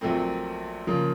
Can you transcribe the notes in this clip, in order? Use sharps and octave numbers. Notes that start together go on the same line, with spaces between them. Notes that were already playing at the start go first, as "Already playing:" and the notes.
A#1 A#2 F#3 A3 C4
C#3 F3 A#3